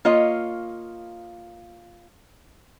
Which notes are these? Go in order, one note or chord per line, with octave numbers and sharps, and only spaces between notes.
A#3 F4 C#5 D#5